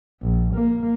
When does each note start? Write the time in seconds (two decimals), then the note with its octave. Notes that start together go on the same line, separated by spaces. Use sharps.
0.22 A#1
0.55 A#3